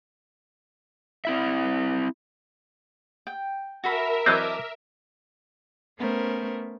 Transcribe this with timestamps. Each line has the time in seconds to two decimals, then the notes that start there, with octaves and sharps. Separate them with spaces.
1.25 C4 E4 E5
3.27 G5
3.84 F#4 A4 A#4 E5 B5
4.26 E3 F#3 C4 D5 D#5 A5
5.99 A3 B3 C#4 A#4 C5